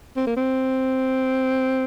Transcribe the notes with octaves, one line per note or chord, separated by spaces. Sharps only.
C4
A#3
C4